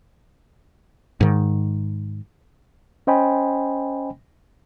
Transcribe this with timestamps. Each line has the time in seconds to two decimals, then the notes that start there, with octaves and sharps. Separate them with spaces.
1.21 G#2 D#3
3.07 C#4 C5 D#5 G5 G#5 B5